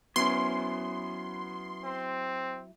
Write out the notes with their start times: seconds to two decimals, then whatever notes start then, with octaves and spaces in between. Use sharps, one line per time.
0.16 F#3 B3 C#4 E4 C6
1.85 C4